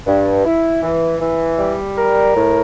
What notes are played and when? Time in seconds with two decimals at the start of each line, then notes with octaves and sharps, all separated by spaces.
0.06 G2
0.45 E4
0.83 E3
1.21 E3
1.59 G3
1.98 A#4
2.35 A2